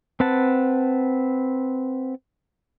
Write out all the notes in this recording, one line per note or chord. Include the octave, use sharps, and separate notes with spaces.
C4 B4 F#5 A5